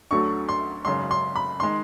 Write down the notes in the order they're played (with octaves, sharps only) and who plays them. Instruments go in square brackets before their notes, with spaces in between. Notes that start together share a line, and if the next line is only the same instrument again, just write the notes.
[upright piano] D2 D3 F#3 A3 C#6
C6
G#1 F#2 C#3 C6
C6
B5
D#3 G#3 C6